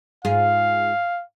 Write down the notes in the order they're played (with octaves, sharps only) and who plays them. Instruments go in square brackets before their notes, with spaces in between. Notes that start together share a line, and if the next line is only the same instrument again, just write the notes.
[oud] G#2 F4 G#4 [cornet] F5